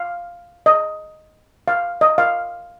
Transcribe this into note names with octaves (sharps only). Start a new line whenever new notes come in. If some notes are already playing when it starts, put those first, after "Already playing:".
Already playing: F5
D#5
F5
D#5
F5